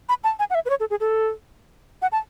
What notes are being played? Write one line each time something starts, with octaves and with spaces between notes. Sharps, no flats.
B5
A5
G#5
F#5
E5
B4
C#5
A4
G#4
A4
F#5
A5